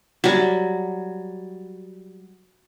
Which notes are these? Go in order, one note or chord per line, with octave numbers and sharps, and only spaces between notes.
F#3 G3